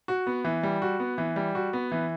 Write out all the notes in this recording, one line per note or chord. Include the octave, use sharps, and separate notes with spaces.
F#4
B3
E3
G3
F#4
B3
E3
G3
F#4
B3
E3